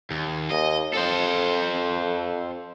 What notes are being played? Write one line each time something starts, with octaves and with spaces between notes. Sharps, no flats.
D#2
D#2 D#5
F2 A4 C5